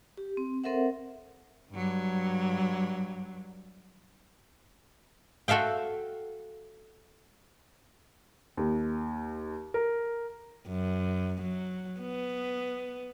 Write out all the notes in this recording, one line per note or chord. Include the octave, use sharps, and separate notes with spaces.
G4
C4
C4 A4 A#4 C5 E5 F#5
G2 F#3
F#4 A4 E5 F5 G5
D#2
A#4
F#2
F#3
B3